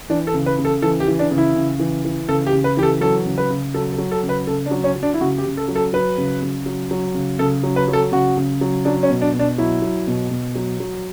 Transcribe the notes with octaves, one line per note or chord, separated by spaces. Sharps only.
E3 D4
A4
C#3
B4
C#3
A4
E3 A4
G4
E3
D4
C#3
E4
C#3
E3
E3
C#3 A4
G4
C#3
B4
E3 G4
A4
F#3 A4
C#3
B4
C#3
F#3 A4
A4
F#3
A4
C#3
B4
C#3 A4
D4
F#3
C#4
F#3
D4
E4
C#3 F#4
G4
C#3
A4
F#3
A4
F#3 B4
C#3
C#3
F#3
F#3
C#3
C#3 A4
F#3
B4
F#3
A4
C#3 F#4
C#3
F#3
F#3 D4
C#4
B2
D4
B2
D4
F#3 E4
F#3
B2
B2
F#3
F#3